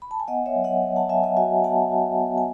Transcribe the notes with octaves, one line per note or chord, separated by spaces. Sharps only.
B5
A5
G#5
B3 D#5 F#5
C#5 E5
F#3
D#5 F#5
F#3
F#5 A5
F#3 E5 G#5
D#5 F#5
F#4 E5 G#5
B3 F#5 A5
F#4
B3
G#5